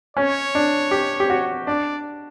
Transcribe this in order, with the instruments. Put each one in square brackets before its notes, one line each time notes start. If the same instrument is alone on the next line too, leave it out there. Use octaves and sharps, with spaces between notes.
[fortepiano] C#4 [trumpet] C#5
[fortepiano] D4
G4
G4
F#4
[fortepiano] D4 [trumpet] D5